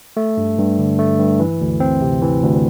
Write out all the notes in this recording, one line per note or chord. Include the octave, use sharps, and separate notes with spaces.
A3
G2
G2
D3
A3
G2
E3
D2
C4
C3
E3
D2